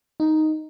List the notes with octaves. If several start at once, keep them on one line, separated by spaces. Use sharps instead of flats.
D#4